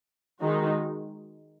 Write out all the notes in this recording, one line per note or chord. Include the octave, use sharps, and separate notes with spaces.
D#3 G#3 D#4 F#4